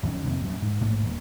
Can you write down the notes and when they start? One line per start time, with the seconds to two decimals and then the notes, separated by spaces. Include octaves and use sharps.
0.03 F2 D#3 F#3 C#4
0.26 F2 C3 A#3
0.44 F#2 A#2
0.62 G#2
0.81 A#1 G#2 A3 A#3
1.03 D#1